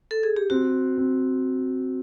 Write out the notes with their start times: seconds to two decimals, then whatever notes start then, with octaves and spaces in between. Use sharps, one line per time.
0.11 A4
0.23 G#4
0.36 G4
0.50 C4 F#4
0.98 C4